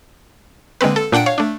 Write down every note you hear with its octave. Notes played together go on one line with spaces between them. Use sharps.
D3 G#3 A#3 C4 B4
A4
A#2 D4 F#5 G5 D7
C#5 F5
A3 D4